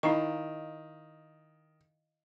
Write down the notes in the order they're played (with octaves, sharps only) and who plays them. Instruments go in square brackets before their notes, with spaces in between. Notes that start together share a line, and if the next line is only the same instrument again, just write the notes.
[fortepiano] D#3 [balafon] E4 A#5 C#6 [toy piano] D#5 F5